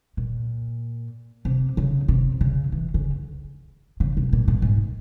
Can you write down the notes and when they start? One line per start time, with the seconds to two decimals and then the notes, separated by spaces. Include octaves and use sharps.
0.17 A#2
1.45 C3
1.77 C#3
2.08 C3
2.41 C#3
2.72 E3
2.94 C#3
4.00 C#3
4.17 C3
4.33 A#2
4.48 A#2
4.62 G#2